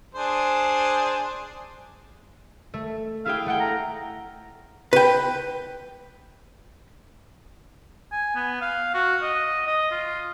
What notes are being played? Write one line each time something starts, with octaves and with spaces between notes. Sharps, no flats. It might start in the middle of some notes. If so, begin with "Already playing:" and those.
D4 G#4 C5
A3
E4 G#4 F5 G5
A3 F#5 G5
A#5
B4 G5
G#5
B3
F5
F#4
D#5
D#5
F4